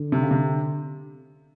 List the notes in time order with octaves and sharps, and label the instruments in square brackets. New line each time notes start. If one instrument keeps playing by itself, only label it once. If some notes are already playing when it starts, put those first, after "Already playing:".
Already playing: [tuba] D3
[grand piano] C3
C#3
C3